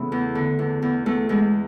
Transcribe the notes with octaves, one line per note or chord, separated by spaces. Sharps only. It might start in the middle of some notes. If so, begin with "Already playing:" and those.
Already playing: C#3 E3 A3 B3
E2
D3
E2
E2
E2 A3
E2 G#3